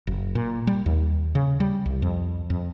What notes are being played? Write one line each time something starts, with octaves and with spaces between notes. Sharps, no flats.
F#1
A#2
G3
D#2
C#3
G3
C2
F2
F2